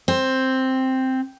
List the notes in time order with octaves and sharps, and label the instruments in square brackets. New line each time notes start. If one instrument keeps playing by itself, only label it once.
[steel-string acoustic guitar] C4